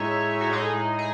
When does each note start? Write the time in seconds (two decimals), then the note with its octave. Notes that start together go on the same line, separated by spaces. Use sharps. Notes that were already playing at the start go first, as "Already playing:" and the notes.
Already playing: A2 G#3 D#4 C#5 E5
0.41 F#4
0.51 A2 G#3 D#4 G#4
0.99 G#4